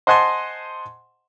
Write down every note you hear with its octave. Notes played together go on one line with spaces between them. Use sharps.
C5 D#5 F#5 G#5 A5 C6